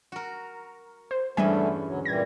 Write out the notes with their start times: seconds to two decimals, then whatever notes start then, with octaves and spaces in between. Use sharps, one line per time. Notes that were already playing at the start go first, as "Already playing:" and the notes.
0.12 F#4 A#4
1.11 C5
1.37 E2 G2 D3 G3 A3 C#4 E5 G#5
1.85 D2 F#3
2.05 A#2 E3 G3 G#6 A#6